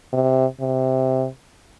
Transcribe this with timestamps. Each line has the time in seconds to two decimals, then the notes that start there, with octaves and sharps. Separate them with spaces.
0.13 C3
0.60 C3